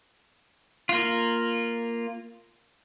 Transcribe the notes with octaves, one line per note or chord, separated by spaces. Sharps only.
A#3 F4